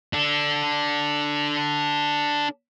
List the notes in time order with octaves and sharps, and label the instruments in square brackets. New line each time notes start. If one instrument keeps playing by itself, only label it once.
[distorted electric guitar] D4 A4